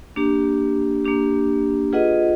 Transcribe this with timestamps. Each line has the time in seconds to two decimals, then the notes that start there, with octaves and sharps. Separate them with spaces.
0.16 A#3 D4 G4
1.04 A#3 D4 G4
1.93 F4 G#4 B4 D#5 F#5